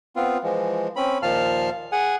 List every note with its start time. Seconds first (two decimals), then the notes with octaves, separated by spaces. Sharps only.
0.16 B3 C4 F4
0.44 E3 F3 G#3
0.96 C4 C#4 B5
1.22 D#2 A#2 F3 F5 A5 F6
1.92 G#4 F#5 G#5